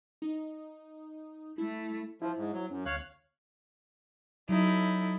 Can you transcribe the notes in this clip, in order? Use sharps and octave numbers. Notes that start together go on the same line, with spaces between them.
D#4
A3 E4
F3 E4 C5
G#2
F#3
F#2 C#4
D2 C#5 F5 F#6
F#3 D#4 E4 A4